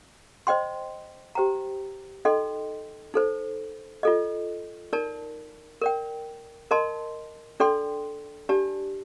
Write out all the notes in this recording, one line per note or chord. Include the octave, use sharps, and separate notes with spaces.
C5 D#5 G5 C6
G4 C5 G5 A#5
D#4 A4 D#5 G5 C6
D#4 A4 C5
F4 A4 D#5
D#4 A#4 D5 A5
A#4 D5 G5
A#4 D#5 A5 C6
D4 A4 D5 G5 C6
D4 G4 D5 A5